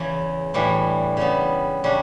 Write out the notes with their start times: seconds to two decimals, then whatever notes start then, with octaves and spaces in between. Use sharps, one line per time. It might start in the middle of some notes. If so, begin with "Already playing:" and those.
Already playing: E2 C#3 E3
0.54 A2 E3 G3 D4
1.17 C#3 G3 B3
1.84 C#3 G3 D4